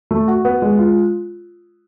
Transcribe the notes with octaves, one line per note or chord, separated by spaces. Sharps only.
A3
F#4
B3
G#3
F4